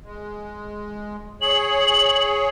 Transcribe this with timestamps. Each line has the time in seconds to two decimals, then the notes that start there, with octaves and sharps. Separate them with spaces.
0.04 G#3
1.42 G#4 C#5 F#7